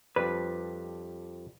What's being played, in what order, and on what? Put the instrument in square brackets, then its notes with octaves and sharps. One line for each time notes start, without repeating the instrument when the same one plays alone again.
[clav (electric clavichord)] F2 G3 D4 [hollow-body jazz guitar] B4